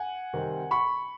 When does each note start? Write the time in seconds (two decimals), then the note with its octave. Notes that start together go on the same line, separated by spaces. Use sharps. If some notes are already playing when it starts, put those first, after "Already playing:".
Already playing: F#5 G#5
0.33 C3 D#3 G3 C4
0.71 B5 C#6